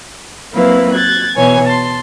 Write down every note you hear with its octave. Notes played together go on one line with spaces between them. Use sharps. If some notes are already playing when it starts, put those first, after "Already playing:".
F#3 A#3 C4 E4 B4 F5
F#6 G#6 A6
B2 E3 C#5 G#5
A5 C6